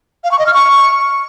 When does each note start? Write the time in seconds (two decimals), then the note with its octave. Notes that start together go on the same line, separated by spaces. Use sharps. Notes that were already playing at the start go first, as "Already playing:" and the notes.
0.24 F5
0.32 C#6
0.39 D#5
0.46 F6
0.54 C#6